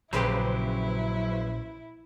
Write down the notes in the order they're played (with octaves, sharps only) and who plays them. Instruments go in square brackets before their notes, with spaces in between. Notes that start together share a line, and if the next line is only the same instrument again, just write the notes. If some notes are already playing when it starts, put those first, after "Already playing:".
[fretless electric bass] A#1 [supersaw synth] C#3 B4 C5 [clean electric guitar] F#3 G4 [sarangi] E4